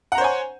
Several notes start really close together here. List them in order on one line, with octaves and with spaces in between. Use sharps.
F#5 A#5 C5 C#5 G#5